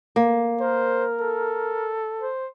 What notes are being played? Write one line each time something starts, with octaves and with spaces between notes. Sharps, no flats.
A#3
A#4 C5
A4
C5